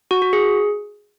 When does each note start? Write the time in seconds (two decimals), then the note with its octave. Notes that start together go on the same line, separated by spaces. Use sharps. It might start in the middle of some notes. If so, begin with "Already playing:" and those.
0.11 F#4
0.22 F#4
0.33 G#4